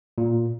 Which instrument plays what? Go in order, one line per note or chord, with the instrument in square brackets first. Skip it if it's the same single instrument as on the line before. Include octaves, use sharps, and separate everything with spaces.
[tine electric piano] A#2